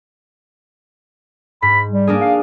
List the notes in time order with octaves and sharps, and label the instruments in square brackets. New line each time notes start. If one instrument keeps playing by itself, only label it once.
[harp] G#2 [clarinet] B5
[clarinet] G3
[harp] A#3 D4 G#4
[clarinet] F5